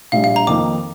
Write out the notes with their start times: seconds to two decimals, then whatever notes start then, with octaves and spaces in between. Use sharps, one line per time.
0.12 A#1 A2 G3 F5
0.24 F5
0.36 A#5
0.47 F2 D#3 A#3 D#4 D6